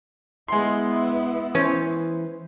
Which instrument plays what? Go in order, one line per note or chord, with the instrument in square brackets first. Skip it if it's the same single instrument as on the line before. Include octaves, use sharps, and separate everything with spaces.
[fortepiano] G#3 C6 [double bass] B3 E4
[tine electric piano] E3 C5 [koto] C#4